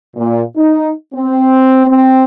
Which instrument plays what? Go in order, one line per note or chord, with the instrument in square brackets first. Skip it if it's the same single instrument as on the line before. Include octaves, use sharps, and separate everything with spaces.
[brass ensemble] A#2
D#4
C4
C4